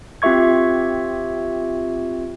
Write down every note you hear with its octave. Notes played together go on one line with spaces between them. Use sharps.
C4 F4 G4 E5 C#6 G#6